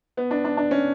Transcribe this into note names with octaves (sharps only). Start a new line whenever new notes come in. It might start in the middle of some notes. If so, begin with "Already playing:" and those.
B3
D4
D4
D4
C#4